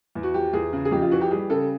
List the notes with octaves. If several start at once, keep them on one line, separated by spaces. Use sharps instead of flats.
E2
F#4
F3 G4
E2 G#4
C#3
G#4
F2 G4
F4
E3 F#4
G4
G3 G#4
C#3 A4